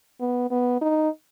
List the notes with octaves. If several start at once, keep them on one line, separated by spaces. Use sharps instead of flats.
B3
B3
D#4